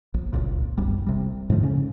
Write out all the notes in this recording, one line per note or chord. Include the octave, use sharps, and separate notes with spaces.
A#1
D1 G1 C#2 A#2
F#1 B1 G3
C3 G3
G#2 D3 F3 A3
C#3 C#4